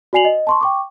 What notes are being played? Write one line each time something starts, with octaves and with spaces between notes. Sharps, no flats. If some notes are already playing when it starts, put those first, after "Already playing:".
F#4 D5 G#5 C7 F7 F#7
D#5
A5 C6 C#6
G5 C#6 D6